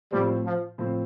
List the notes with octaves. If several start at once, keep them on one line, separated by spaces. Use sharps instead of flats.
A2 F3 G3 C4
F3
A2 F3 C4